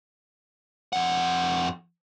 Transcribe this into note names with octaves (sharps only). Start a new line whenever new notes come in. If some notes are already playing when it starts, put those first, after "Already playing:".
F2 F#5